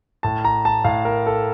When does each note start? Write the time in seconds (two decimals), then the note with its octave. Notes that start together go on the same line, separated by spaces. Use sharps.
0.23 A2 A5
0.44 A#5
0.65 A5
0.85 A2 F5
1.05 A#4
1.26 A4